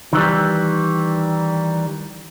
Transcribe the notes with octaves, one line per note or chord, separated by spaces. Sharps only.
D#3 E3 G3